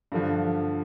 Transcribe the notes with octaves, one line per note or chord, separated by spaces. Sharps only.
G2 D3 F3